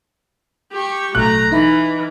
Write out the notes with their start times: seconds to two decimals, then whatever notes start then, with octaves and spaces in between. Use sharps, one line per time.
0.73 G4 C#6
1.15 A1 B2 F#3 A3 A#5 F#6
1.52 E3 D#4 E5 B5